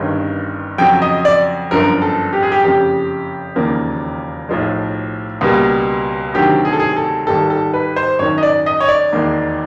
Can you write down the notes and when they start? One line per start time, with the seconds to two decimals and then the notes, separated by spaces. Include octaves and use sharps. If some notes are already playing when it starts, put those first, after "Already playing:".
Already playing: G1 G2 D#3 G#3 C#4
0.78 F2 C#3 F#3 G5
1.02 D#5
1.25 D5
1.71 G1 F#2 D3 F3 A#4
2.02 A4
2.33 G4
2.43 G#4
2.52 G4
2.64 F#1 F2 C#3 G4
3.56 E1 D#2 C#3 F3 A#3
4.49 B1 A2 F3 G#3
5.41 C#2 B2 G3 A#3
6.34 D2 C3 D#3 F#3 G4
6.65 G#4
6.73 A4
6.80 G#4
6.97 A4
7.27 G#1 G#2 D#3 G3 A4
7.50 A4
7.74 B4
7.96 C5
8.19 G#1 F#2 D#3 C#5
8.38 D#5
8.43 D5
8.66 D#5
8.80 C#5
8.88 D5
9.13 E1 D#2 D#3 G#3